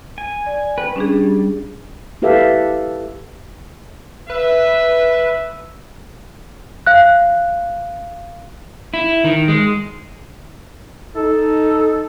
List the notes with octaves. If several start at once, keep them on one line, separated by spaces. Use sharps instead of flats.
G#5
D5
B4 G5
G3 C#4 D4 G#4
E4 G4 A4 B4 E5 F5
B4 E5
F5 F#6
E4
D#3
G#3
D#4 A4